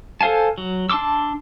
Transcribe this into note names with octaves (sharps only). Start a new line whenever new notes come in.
A4 C5 F5 G#5 A5
F#3
D4 A5 C6 D6 E6